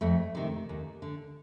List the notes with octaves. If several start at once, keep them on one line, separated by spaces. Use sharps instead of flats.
F2 A3
C3 D#3
D#2
D3